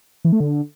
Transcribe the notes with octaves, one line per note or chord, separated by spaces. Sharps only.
E3
A3
D3